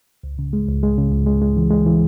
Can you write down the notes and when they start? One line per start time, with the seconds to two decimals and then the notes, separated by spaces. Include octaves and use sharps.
0.24 C#2
0.39 C#3
0.53 G#3
0.68 C#2
0.83 G#3
0.98 C#3
1.12 C#2
1.26 G#3
1.42 G#3
1.57 E3
1.71 G#3
1.86 E3